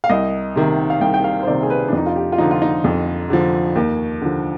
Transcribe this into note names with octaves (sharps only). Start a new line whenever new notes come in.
F5
C2 D#5
C3 D#3
F5
C2 G5
G5
F5
C5
C3 D#3 D5
G#4
B4
D4
F2 D#4
F4
G4
F4
D3 F3 D#4
F4
D#4
F2
D3 F3
D#2
D3 F3